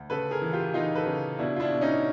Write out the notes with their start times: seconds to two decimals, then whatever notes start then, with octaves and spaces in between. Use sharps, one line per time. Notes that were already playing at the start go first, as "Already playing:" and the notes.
Already playing: D2
0.10 C#3 A4 B4
0.31 G#4 A#4
0.42 E3
0.53 F4 G4
0.74 E3 D#4 F4
0.95 A4 B4
1.06 C#3
1.39 B2 D4 E4
1.56 F4
1.60 D4 E4
1.71 B2
1.81 C#4 D#4